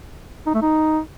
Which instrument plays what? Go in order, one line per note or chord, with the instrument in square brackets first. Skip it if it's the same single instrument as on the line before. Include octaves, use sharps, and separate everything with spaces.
[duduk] D#4
A3
D#4